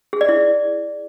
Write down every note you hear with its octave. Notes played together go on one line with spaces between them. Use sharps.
G#4
D5
E4